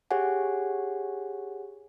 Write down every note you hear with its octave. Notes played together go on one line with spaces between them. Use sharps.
G4 G#4 C#5 F#5 G#5